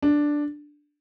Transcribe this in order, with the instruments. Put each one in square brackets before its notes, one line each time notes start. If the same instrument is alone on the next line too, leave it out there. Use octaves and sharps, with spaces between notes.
[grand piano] D4